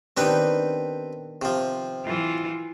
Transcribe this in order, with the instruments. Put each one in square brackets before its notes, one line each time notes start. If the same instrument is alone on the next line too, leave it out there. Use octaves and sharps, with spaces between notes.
[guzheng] D#3 B3 D4 [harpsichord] C4 G4 B4
[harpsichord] C3 F3
[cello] E3 F4